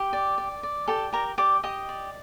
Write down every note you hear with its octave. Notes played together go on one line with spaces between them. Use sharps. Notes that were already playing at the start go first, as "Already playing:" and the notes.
Already playing: G4 G5
D5
D5
D5
G4 A4 A5
G4 A#4 A#5
G4 D5 D6
G4 D#5 D#6
D5